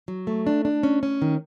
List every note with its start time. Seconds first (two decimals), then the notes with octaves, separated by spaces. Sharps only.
0.08 F#3
0.27 A3
0.47 D4
0.65 D4
0.83 C#4
1.03 C#4
1.22 D#3